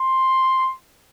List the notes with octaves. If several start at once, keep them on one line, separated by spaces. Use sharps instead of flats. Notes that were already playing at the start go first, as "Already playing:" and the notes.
Already playing: C6